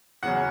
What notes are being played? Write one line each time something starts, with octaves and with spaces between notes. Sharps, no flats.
E2 C#3 F#3 F#5